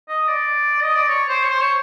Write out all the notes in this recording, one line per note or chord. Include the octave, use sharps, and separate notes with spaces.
D#5
D5
D#5
D5
C#5
C5
C#5
C5
C#5